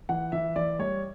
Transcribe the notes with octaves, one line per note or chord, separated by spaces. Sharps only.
E3 F#5
E3 E5
E3 D5
G3 C#5